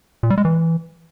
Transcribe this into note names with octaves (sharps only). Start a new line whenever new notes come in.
A#2
G3
G#3
E3